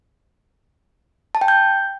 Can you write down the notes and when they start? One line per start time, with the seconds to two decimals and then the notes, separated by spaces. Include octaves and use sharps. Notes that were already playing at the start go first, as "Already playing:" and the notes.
1.35 A5
1.41 G5
1.48 G6